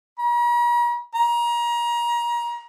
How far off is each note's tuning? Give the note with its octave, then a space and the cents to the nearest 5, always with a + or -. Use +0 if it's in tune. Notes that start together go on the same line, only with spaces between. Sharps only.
A#5 +45
A#5 +30